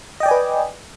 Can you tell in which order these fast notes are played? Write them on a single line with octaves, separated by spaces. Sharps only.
D#5 G5 D5 G#5 B4